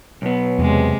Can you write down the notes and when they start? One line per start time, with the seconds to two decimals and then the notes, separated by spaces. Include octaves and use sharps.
0.22 B1 B3
0.59 E2 C3 G#3